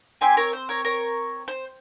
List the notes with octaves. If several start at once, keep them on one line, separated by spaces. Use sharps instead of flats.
C4 G4 G#5 C6
A#4 C#5
C5
A#4 C#5
A#4 C#5
C5